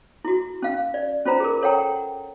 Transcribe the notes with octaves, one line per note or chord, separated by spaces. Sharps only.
E4 F#4
C#4 F5
D5
C#4 F4 C5 A#5
G#4 A#4
A4 C#5 F#5 G5 A#5